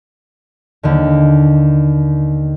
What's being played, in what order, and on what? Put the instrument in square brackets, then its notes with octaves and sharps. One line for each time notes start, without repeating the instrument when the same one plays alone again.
[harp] D#2 D3